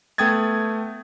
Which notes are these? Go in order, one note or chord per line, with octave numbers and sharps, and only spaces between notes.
A3 B3 G5 D#6 G#6 A6